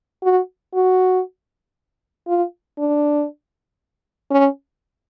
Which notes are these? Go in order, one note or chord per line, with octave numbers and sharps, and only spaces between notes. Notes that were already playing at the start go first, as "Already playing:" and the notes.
F#4
F#4
F4
D4
C#4